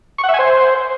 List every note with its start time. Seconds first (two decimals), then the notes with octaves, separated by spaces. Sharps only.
0.18 C#6
0.24 F#5
0.29 E5
0.34 G#5
0.39 C5